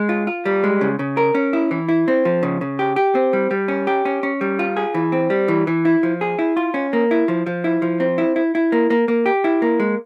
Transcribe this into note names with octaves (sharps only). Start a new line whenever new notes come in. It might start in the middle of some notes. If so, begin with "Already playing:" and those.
Already playing: G#3
F4
F4
G3
G#3
C#3
C#3
A#4
C#4
E4
E3
E4
C4
F3
C#3
C#3
G4
G4
C4
G3
G3
C#4
G4
C#4
C#4
G3
F4
G#4
E3
C4
G3
E3
E3
E4
F3
G#4
E4
F4
C#4
A#3
E4
F3
F3
E4
F3
C4
E4
E4
E4
A#3
A#3
A#3
G4
E4
A#3
G#3